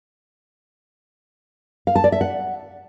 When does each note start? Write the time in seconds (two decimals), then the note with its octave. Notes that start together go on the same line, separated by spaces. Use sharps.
1.87 F5
1.96 A5
2.04 D5
2.12 E5
2.21 F#5